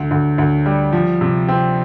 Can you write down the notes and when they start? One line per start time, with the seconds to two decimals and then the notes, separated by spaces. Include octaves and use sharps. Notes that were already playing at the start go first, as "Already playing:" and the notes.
Already playing: D2
0.11 D2
0.38 D2
0.66 G3
0.93 F3
1.21 C3
1.48 C4